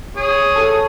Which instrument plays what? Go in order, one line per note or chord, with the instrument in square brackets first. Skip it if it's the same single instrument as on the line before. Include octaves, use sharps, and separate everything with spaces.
[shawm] G#4 [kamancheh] C#5
[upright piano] A4